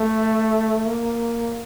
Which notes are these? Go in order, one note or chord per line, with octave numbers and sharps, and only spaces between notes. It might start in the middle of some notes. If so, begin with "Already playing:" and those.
Already playing: A3
A#3